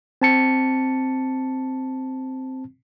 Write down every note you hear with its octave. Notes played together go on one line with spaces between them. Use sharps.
C4 A5 C#7